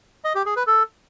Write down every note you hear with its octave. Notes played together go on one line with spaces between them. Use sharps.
D#5
G4
G#4
B4
A4